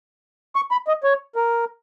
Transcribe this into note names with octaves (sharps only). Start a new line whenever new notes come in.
C#6
B5
D#5
C#5
A#4